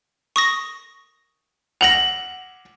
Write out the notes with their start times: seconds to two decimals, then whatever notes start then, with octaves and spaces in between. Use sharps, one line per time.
0.36 C#6 D#6 A#6
1.81 F#5 A#6 F7 F#7